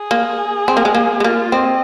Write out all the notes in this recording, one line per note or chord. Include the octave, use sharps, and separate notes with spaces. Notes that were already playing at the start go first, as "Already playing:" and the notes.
Already playing: G#4
A#3
C4
A#3
G#3
A#3
G#3
A#3 F4
C4 D#5